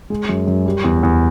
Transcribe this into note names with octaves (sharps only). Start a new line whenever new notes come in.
G#3
F#2
F#2
G3
E2
E2